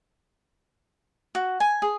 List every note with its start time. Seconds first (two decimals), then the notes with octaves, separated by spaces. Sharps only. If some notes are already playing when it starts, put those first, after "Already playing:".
1.35 F#4
1.60 G#5
1.82 G#4